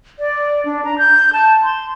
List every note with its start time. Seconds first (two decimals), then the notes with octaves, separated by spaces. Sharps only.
0.19 D5
0.65 D4
0.85 A#5
0.98 G6
1.33 A5
1.63 C6